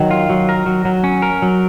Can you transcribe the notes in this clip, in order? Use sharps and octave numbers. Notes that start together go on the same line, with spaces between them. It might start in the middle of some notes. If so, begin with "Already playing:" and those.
Already playing: D#3 F#3
F4
F#3
A#4
F#3
F#3
C#4
A#4
F#3